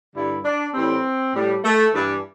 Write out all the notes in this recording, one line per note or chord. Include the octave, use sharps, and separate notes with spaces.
G2 D3 G3 E4
D4
A2 E3 G3 C4
A2 G3
A3
G2 E3 G3 D4